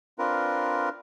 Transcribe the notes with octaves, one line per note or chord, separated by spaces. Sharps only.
C4 D4 F4 A#4 B4